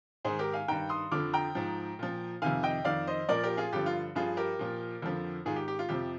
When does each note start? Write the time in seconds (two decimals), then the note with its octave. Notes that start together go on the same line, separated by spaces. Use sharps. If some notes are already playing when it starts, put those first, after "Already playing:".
0.25 G#2 D#3 G#4 C5
0.39 G4 A#4
0.54 F5 G#5
0.68 G2 D#3 G5 A#5
0.89 C6 D#6
1.11 F2 D3 F3 D6 F6
1.34 G5 A#5
1.55 G#2 F3
1.99 A#2 F3
2.42 F2 C3 D#3 F5 G#5
2.63 D#5 G5
2.85 F2 D#3 D5 F5
3.07 C5 D#5
3.29 A#2 F3 A#4 D5
3.43 G4 A#4
3.57 F4 G#4
3.73 G2 D3 F3 G4
3.86 F4
4.15 G2 F3 F4 G#4
4.37 G4 A#4
4.59 A#2 F3
5.02 F2 D3 F3
5.45 G#2 D#3 F4 G#4
5.56 G4
5.68 G4
5.79 F4
5.89 F2 C3 F3 G4